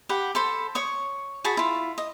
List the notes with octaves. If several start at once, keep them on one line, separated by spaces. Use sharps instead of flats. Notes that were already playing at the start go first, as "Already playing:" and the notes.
G4 F#5 B5
A4 C5 B5
C#5 C#6 D#6
F#4 G#4 A5 B5
E4 F4
D#5